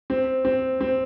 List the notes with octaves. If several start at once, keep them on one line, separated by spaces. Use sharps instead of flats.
C4
C4
C4